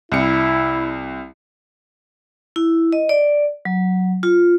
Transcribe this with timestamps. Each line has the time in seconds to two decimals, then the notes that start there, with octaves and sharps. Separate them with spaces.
0.12 C2 E4 C#7
2.56 E4
2.92 D#5
3.09 D5
3.65 F#3
4.23 F4